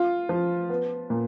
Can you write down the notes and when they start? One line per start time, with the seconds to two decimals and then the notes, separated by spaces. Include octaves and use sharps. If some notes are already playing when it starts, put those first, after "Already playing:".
Already playing: F4
0.29 F3
0.70 B3
1.10 A#2